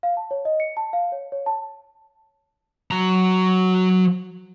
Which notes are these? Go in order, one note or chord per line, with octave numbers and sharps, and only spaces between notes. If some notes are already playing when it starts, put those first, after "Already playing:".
F5
A5
C#5
D#5
C#7
A5
F5
C#5
C#5
A5
F#3 A#5